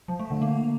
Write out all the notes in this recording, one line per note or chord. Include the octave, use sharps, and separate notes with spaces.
F3
A3
D3
A#3